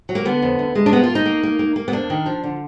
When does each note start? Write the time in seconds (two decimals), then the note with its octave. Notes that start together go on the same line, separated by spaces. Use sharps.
0.09 F#3
0.15 A#3
0.25 D3 B3
0.42 F2
0.59 D2
0.75 G#3
0.86 D4
0.92 A#3 B3
1.03 F4
1.10 A#3
1.15 D#4
1.25 A#3
1.43 A#3
1.59 A#3
1.76 A#3
1.88 B3
1.92 F2 D4
2.10 D#3
2.26 F3
2.44 D3